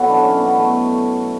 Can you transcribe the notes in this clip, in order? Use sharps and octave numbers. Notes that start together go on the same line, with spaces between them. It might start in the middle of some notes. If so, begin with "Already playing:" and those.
Already playing: B2 F#3 E4 F#4 A4
D4
C#4
B3
A3